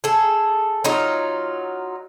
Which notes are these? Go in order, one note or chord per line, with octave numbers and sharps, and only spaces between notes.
G#4 A4
F#3 D#4 F4